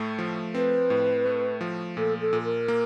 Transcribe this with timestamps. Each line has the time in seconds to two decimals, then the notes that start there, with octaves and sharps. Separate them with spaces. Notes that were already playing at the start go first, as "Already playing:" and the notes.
Already playing: A2 A3
0.18 F3
0.54 C4 B4
0.90 A2
1.26 A3
1.61 F3
1.97 A#2 A4
2.21 A4
2.33 A#2
2.44 A#4
2.68 A#3